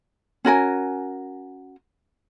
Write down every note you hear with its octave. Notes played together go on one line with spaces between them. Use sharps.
C#4 F#4 A#4 G#5